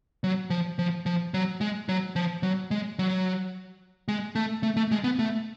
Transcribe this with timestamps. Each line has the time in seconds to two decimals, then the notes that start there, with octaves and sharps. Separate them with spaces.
0.24 F#3
0.50 F3
0.79 F3
1.06 F3
1.34 F#3
1.61 G#3
1.89 F#3
2.16 F3
2.43 F#3
2.71 G#3
2.99 F#3
4.08 G#3
4.35 A3
4.63 A3
4.77 A3
4.91 G#3
5.04 B3
5.19 A3